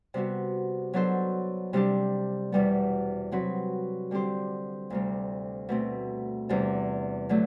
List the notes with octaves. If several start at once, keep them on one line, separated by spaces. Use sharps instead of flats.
C3 G3 B3 F#4
F#3 B3 D4 A4 C5
C3 G3 D4 G4
E2 B2 G3 B3
C3 F#3 C4 F#4 B4
D3 G3 C4 G4 C5
D2 C3 G3
B2 A3 C4
E2 C3 G3 D4
D3 F#3 A3